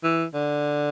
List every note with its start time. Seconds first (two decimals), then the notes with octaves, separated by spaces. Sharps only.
0.03 E3
0.34 D3